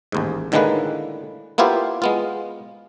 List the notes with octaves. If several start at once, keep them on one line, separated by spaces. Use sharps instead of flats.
A1 D#2 G#2
A2 D3 D#3 G#3 A#3 B4
A#3 B3 E4 F4 G4 C5
G#3 B3 F4